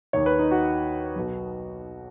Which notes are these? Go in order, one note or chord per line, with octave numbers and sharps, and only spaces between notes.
D#2 D#3 C#5
B4
D#4
F#4
B1 B2